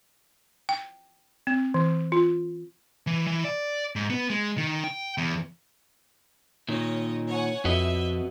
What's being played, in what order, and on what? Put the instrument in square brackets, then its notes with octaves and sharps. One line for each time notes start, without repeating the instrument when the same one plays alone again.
[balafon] G5
C4
E3
F4
[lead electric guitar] E3
E3
D5
G#2
B3
G#3
D#3
G5
E2
[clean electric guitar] A#2 D#3 [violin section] C#5 D#5
[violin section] C#5 F#5 G#5
[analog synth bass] F2 [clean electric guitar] F#4 B4 D#5 [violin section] E5